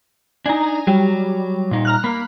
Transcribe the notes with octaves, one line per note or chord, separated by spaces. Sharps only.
D4 D#4 G#5 A#5
F#3 G3
A#2 D#4
A#5 F6 F#6
A#3 B5